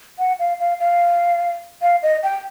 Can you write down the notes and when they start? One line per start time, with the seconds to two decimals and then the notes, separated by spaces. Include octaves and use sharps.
0.19 F#5
0.39 F5
0.60 F5
0.80 F5
1.82 F5
2.03 D#5
2.23 G5